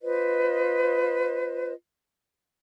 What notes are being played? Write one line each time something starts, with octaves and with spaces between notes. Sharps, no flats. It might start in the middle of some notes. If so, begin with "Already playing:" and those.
F4 B4 C5 D#5